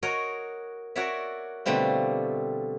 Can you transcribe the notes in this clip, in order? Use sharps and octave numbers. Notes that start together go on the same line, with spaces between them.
F#4 A#4 C#5 D#5
F#4 A#4 C#5 D5 E5
B2 D3 G3 A3 C4 F4